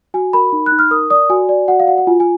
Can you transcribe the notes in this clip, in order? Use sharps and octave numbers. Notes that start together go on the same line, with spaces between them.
F#4 G#5
A#4 B5
D#4
F#6
D#4
F6
A#4 D#6
D5 D#6
F#4 G#5
D5
F#4 F#5
F5
F#4 F#5
F#5
F4 G#5
G#5